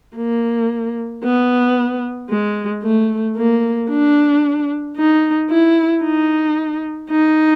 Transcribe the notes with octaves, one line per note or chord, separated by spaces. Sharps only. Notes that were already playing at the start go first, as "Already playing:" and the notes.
A#3
B3
G#3
A3
A#3
D4
D#4
E4
D#4
D#4